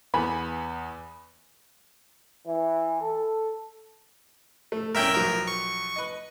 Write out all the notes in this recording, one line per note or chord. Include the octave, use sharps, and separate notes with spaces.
E2 B3 G#5 B5
E3
A4
A3
C2 A#2 C#4 A#4 E5 G5
B1 F3 F#3 A#4
C#6
B4 D#5